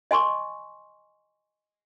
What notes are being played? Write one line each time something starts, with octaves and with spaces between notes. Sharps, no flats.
D#5 G#5 C6 C#6